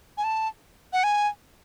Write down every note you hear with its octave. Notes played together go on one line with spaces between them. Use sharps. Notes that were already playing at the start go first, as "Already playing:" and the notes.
G#5
A5
F#5
G#5